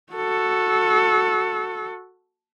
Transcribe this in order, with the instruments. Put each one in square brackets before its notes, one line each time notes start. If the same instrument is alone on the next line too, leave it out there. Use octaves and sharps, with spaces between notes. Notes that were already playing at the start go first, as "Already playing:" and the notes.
[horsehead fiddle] F#4 A4